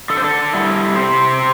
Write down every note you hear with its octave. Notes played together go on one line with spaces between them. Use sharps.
D3 A4
C5
A4
G3 E4
C3 G4 C5